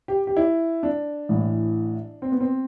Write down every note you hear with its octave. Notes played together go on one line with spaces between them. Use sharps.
G4
G4
E4
D4
A1 A2 E3
C4
B3
C4